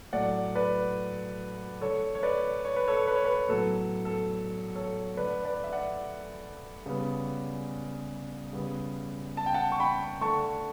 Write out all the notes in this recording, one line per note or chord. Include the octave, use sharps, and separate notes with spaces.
A2 F#3 A3 D5 F#5
B4 D5
D3 A3 A4 C#5
C#5
B4 D5
C#5
B4
A4 C#5
B4
C#5
B4
A2 F#3 B3 A4
A4
A4 C#5
D3 A3 B4 D5
B4 D5
E5
D5 F#5
C#3 G3 B3
C#3 G3 B3
A5
G5
F#5 A5
C#6
G5 B5
D3 A3 A5 C#6